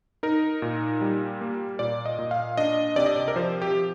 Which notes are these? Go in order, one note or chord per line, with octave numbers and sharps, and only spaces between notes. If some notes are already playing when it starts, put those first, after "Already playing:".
D#4 A#4
A#2
G3
A#3
A#2 D5
D#5
A#2
F5
D4 D#5
C3 D5
D#5
D5
A#4
F3 C5
G4
F3